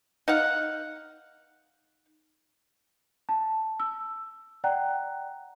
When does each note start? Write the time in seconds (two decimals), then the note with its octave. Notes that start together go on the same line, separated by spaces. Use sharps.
0.28 D#4 F5 F#5
3.29 A5
3.80 E6
4.64 D5 F#5 G5 A#5 F#6